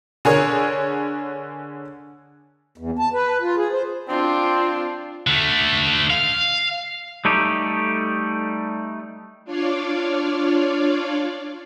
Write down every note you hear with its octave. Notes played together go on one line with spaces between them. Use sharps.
D3 G#4 A#4 C#5
E2
A5
B4
F4
G#4
C5
C4 D4 F4
D3 A3
F5
G3 A3 D#4 G4
D4 F4 C#5 D5 F5